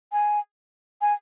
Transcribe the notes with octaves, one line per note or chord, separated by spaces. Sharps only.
G#5
G#5